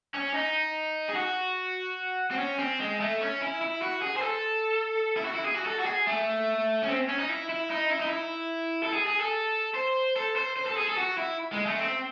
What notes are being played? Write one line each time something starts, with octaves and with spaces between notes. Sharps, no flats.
C#4
D#4
G#4
F#4
C4
C#4
C4
G#3
A3
C#4
E4
E4
F#4
G#4
C5
A4
E4
F#4
E4
G#4
F#4
A4
F#4
G#4
A3
C#4
C4
C#4
D#4
E4
E4
D#4
E4
D#4
E4
A4
G#4
G#4
A4
C5
A4
C5
C5
A4
G#4
A4
F#4
E4
G#3
A3
C4